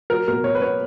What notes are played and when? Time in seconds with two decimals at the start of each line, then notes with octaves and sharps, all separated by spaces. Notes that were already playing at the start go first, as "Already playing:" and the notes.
0.10 F#3 A#4
0.28 B2 A#4
0.44 B2 C#5
0.55 B4
0.61 B3 C#5